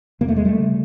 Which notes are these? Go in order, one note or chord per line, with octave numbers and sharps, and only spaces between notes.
E2 C3 A#3
A3
G#3
G3 A3
C#3